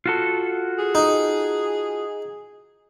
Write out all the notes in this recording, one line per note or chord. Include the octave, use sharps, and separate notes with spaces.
F4 F#4 A4
G#4
D#4